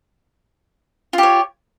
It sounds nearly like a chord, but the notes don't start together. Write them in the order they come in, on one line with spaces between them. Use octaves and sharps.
F4 G4 C#5